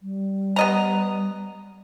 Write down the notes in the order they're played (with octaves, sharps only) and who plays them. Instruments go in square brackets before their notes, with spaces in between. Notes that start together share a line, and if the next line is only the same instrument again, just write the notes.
[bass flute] G3
[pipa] B3 D#5 A#5